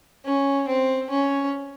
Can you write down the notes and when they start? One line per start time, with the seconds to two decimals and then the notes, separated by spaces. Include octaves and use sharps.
0.25 C#4
0.67 C4
1.10 C#4